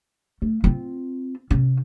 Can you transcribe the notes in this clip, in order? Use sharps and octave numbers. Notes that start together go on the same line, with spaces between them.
A3
C4 F4
C3 C#4